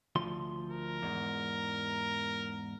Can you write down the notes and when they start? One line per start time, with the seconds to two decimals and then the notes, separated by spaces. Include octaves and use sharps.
0.16 D2 F3 C6
0.70 A#4
1.02 E2 G#2